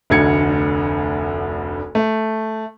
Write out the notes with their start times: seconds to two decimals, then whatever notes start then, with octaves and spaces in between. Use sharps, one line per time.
0.10 F1 D2 D3 G#6 C#7
1.95 A3